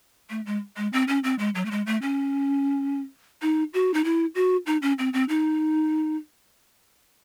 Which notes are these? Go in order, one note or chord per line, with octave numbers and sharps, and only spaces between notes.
A3
G#3
G#3
C4
C#4
C4
G#3
F#3
A3
G#3
A3
C#4
D#4
F#4
D#4
E4
F#4
D#4
C#4
C4
C4
D#4